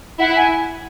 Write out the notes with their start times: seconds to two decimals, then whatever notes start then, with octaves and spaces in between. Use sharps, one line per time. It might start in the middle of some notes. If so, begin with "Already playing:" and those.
0.20 E4 F#5
0.36 G#5